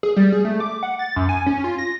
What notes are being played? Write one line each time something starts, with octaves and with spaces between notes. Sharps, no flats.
G#4
G3
G#4
A3
D6
F#5
A6
F#2
G#5
C#4
F4
A#6